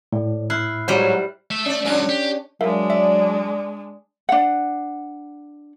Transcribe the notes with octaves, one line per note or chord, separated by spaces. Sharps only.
A2 A4 D5
E4 F6 F#6 C7
G#2 F#3 G3 C5
A3 E5
C#4 D5
F#3 G#3 C#4 D4
G4
F#3 G#3 D4 A#4 E5 F5
D5 E5
D4 F#5